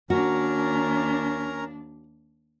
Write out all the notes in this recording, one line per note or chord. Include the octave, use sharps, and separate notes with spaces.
D#2 C#4 D4 F#4 A#4 A#5